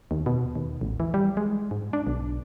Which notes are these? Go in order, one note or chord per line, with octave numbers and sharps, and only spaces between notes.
D#2
B2
D#2
A1
E3
G3
G#3
G#2
D4
B1